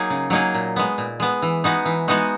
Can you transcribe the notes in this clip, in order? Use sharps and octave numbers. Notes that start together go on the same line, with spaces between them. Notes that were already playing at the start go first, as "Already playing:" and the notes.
Already playing: F#3 A#3 D#4 G#4
C#3
F#3 A#3 D#4 G#4
A#2
G#3 B3
A#2
G#3 B3
E3
G#3 B3 D#4 F#4
E3
G#3 B3 D#4 F#4